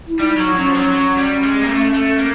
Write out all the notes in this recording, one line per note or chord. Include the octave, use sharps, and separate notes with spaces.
E4
G3 D#4
F#3
F#3 C#4
F3
F#3
F#3
G3
G#3
A#3
A3
A3
A#3